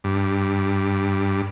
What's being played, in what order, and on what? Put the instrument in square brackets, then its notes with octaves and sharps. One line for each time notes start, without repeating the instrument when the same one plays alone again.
[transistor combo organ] G2